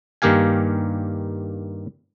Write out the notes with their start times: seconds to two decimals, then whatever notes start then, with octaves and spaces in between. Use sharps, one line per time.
0.22 G2 D#3 A#3 G4 F5 G#5